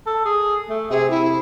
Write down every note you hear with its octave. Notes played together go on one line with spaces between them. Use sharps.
A4
G#4
A3
C3 G#4
E4